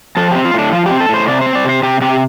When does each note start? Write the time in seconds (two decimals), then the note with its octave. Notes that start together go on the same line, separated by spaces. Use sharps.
0.17 F3 A4
0.31 C4 G4
0.45 F4
0.54 A2 D4
0.72 F3 F4
0.86 G4
0.91 C4
1.00 A4
1.09 A2 C5
1.28 C3 D5
1.41 C5
1.46 C4
1.55 D5
1.65 C3 C5
1.83 C3 G4
2.01 C3 G4